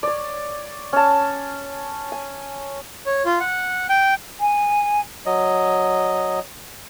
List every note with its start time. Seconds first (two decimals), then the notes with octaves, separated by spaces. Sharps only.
0.03 C#5 D5
0.93 C#4 A5
2.12 G#5
3.06 C#5
3.25 F4
3.40 F#5
3.89 G5
4.40 G#5
5.26 F#3 D#5